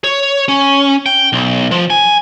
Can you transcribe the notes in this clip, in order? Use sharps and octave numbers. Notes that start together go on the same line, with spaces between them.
C#5
C#4
G5
B1
F3
G#5